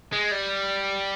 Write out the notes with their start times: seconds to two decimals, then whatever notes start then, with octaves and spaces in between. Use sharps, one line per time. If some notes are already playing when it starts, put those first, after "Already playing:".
0.12 G#3
0.31 G3